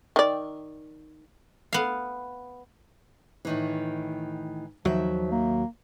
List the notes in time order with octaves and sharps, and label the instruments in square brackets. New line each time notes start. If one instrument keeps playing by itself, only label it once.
[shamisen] D#3 D5
[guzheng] B3 F5
[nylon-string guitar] A2 D#3 E3
[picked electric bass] D#2 F#3 [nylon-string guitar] D#3 E5 [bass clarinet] F3
[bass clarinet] A#3